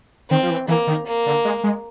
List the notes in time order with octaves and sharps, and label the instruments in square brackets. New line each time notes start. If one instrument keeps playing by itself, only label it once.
[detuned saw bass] D#3 [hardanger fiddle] C4
[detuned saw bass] F3
E3
[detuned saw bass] E3 [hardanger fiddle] A#3
[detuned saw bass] D#3
[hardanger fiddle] A#3
[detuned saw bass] D3
G#3
G#3